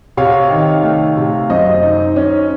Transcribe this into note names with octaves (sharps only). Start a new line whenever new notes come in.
C3 C#5 F5
D#3
A3
C3
F#2 C5 D#5
D#4
C#4